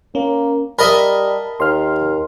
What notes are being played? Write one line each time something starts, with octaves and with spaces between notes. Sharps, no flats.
A#3 C#4
G3 A#4 D#5 E5 A5 B5
D#2 C6 F6